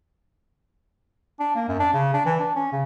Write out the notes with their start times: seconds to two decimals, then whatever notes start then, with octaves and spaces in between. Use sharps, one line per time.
1.40 D4
1.55 A#3
1.68 F#2
1.80 D4
1.93 C#3
2.14 D4
2.25 E3
2.39 D4
2.56 C#4
2.72 C#3